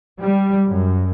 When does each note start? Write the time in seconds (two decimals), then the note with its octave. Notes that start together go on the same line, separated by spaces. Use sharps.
0.21 G3
0.67 F#2